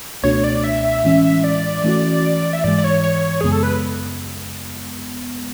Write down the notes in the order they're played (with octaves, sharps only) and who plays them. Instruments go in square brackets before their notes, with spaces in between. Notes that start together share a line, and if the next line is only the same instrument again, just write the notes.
[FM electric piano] C#2 B2 A3 D4 F#4 [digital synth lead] C#5
[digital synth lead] D5
E5
[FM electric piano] A2 E3 G#3 C#4
[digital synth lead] D5
[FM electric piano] E3 A3 C#4 F#4
[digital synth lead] E5
[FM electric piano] G#2 E3 G#3 [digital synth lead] D5
[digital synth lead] D5
C#5
C#5
[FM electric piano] F#2 C#3 G#3 B3 [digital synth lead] G#4
[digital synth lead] A4
B4